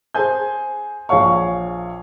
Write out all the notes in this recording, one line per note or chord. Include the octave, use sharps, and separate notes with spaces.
G#4 C5 G#5 G6
A#1 G#4 C#5 F5 C#6